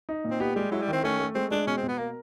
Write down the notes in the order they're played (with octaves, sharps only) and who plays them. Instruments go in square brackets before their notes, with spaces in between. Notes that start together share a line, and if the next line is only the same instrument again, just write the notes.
[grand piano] D#4
A#2
[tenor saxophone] C4
[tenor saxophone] B3 [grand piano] G4
[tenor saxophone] G3 [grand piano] G#3
[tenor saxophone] F#3 [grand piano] E4
[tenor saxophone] G3
[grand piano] D#3 [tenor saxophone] C4
[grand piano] A3 [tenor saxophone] C#4
[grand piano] A3
[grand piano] G#3 [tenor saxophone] C4
[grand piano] G#3 [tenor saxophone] D4
[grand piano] B2 [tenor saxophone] C#4
[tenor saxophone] C4
[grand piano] B2
[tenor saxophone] B3
[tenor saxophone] A#3 [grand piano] A#4